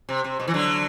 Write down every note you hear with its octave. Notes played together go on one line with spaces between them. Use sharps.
C3
C3
B2
E3
D3 F#3